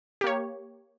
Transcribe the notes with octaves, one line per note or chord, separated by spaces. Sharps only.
A#3 G4 C#5